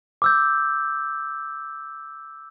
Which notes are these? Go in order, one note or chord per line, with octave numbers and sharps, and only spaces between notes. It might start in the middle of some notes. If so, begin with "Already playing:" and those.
D6 E6 G6